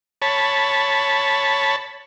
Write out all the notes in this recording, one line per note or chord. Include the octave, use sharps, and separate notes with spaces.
C#5 A5 B5